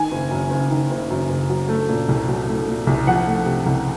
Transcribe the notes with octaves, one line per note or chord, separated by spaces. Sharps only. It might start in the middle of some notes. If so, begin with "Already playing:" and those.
Already playing: D#3 G#5
F#1
F#2
F#1
D#3
F#1
F#2
F#1
F#3
A3
A#2
C2
F#3
A3
A#2
C2
F3 F#5
A3
C3
C2